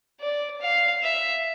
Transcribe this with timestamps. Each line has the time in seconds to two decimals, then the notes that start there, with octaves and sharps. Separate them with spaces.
0.21 D5
0.61 F5
1.02 E5